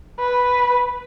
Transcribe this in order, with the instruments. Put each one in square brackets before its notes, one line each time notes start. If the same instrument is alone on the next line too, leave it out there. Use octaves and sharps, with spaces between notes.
[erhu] B4